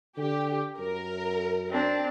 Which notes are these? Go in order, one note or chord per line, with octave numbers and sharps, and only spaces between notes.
D3 G4
F#2 A#4
C4 D4